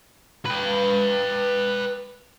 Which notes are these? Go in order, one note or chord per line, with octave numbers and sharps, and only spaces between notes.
B4 G5